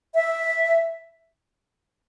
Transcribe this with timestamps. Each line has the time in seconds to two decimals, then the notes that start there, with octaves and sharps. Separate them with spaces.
0.15 E5